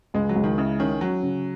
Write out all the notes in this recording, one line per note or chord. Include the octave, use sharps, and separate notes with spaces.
C#2 G#3
F#3
C#2
D#3
C#3 E4
D#3 C#4
F#3 C#4
C#3